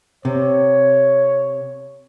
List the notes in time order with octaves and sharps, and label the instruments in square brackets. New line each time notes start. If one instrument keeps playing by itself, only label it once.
[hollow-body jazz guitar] C3 [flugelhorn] C#5